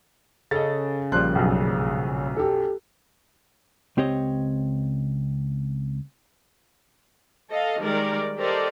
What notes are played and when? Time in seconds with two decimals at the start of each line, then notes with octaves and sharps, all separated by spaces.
0.51 C#3 A4 D#5 A6
1.12 A#1 F3 G3 C6 F#6
1.35 B1 F#2
2.36 G4 A4
3.97 C#2 C4 G4 C#5 D#5
7.49 A4 D#5 F5
7.80 D#3 G3 G#3 A#4 D5
8.37 G4 A4 A#4 C5 D5 D#5